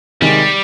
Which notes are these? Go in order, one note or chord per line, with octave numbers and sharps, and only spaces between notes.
C3 D#3 G3 G#3